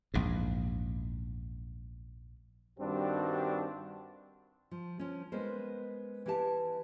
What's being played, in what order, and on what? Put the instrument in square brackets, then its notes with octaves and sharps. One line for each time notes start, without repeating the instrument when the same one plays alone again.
[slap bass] A#1 E2 G#2
[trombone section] G2 D#3 G3 C4 D4 F#4
[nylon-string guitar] F3
F3 C#4
G#3 B3 A#4 C5
E3 E4 G4 D#5 A5